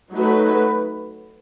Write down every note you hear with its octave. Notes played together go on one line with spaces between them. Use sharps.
F#3 A3 D#4 F#4 B4